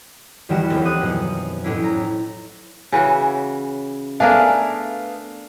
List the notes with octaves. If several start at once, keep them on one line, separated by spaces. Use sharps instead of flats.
E2 D#3 G3 F#4 E7
F1 D#2 C4 A6
D#6 F#6
F#2 B2 F3
F2 A2 A3 C#4 D4 E4
A#5
C#3 E3 F#4
A3 B3 D4 G#4 A#4 F5